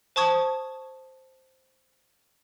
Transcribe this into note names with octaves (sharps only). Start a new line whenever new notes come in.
C5 A5 C#6 D#6 G#6